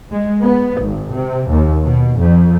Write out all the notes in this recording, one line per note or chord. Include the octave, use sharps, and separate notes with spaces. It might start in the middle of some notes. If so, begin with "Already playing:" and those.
G#3
B3
G#1
C3
D#2
B2
F2